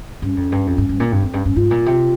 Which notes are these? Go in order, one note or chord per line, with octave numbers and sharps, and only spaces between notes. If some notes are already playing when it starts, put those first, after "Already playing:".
G2 C#4
F2
G2
F2
G2
G2
A#2
G2 C4
F2 C4
G2 C#4
G2 C#4
G#2 F4
A#2
C3